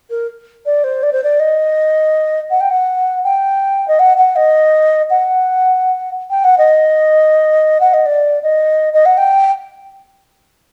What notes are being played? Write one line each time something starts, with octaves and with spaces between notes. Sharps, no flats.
A#4
D5
C5
D5
C5
D5
D#5
F#5
G5
F#5
G5
D#5
F#5
F#5
D#5
F#5
G5
F#5
D#5
F#5
D#5
D5
D#5
D#5
F#5
G5